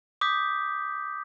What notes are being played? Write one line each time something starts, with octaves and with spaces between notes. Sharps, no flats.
D6 D#6 G6 B6